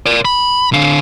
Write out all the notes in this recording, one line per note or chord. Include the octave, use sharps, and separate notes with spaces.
A#4 D5
B5
D3 F5